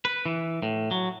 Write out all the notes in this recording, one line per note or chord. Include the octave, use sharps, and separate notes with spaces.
B4
E3
A2
F#3